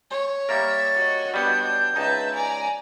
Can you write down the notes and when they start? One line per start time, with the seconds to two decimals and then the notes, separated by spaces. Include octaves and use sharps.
0.11 C#5
0.49 G3 A#3 A#4 E5 A6
0.95 F#4 D#5
1.34 G3 B3 D4 G6
1.96 C#2 D#4 B4 E5 A5
2.35 D5 G#5 A#5